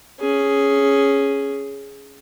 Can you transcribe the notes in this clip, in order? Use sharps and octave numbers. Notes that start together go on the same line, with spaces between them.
C#4 G#4